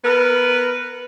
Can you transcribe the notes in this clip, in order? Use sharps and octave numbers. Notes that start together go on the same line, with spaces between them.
B3 A#4 B4